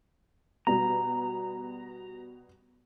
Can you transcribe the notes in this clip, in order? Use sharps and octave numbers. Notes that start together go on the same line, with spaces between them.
B2 G3 B3 A#5